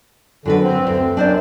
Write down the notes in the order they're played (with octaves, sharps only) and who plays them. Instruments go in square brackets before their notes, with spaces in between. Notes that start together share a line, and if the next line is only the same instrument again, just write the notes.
[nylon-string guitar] F#2 F#4 B4 [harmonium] D3
[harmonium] C4
[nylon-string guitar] D2
[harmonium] F#2 [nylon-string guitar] D4 C5 D5